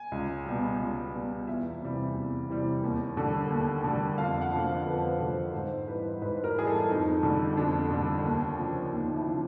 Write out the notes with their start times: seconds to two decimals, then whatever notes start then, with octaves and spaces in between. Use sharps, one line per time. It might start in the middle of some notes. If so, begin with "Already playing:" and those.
Already playing: G#5
0.12 C#2
0.45 B2 G3
0.79 C#2
1.14 B2 G3
1.47 E2 E5
1.81 C3 E3 G3
2.14 E2
2.48 C3 E3 G3
2.83 D#2
3.17 D3 G3
3.50 D#2
3.84 D3 G3
4.18 F2 F5
4.41 F#5
4.52 D3 F3
4.64 F5
4.86 F2 B4
4.97 C5
5.06 B4
5.20 D3 F3 C5
5.54 G#2 C5
5.88 E3 G3 B4
6.21 G#2 B4
6.44 A#4
6.55 E3 G3 G#4
6.67 A4
6.90 F2 D#4
7.23 D3 G3
7.57 F2 D4
7.91 D3 G3
8.25 D#2
8.59 C#3 F3
8.92 D#2 D#4
9.16 E4
9.26 F3
9.32 C#3